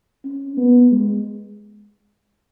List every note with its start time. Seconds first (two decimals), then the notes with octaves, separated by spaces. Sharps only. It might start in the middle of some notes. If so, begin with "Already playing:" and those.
0.24 C#4
0.57 B3
0.91 G#3